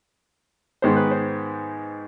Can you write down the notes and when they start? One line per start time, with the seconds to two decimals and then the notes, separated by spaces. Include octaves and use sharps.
0.82 G#2 D#3 G#3 B3 C5
0.97 B4
1.11 C5